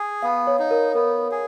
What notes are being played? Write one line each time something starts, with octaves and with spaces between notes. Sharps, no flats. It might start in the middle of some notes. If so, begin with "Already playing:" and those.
Already playing: G#4
B3 F5
C#5
D#4
A#4
B3 A#4
G#4